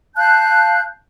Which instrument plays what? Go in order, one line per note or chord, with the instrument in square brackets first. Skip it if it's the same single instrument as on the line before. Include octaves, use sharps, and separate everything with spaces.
[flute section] F5 A5 F#6 G6